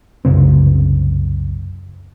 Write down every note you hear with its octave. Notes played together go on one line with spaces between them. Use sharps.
C2 F#2 C#3 C4